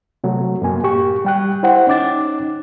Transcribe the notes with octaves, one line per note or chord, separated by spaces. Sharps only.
C3 F#3 A3
F#2 A#3 G#5
A2 G4 C#6
G3 G5 F#6
E4 C5 F#5 G5
C#4 D#4 D6 A6